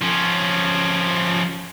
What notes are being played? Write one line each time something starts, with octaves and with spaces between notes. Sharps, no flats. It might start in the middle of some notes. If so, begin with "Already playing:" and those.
F3 C#4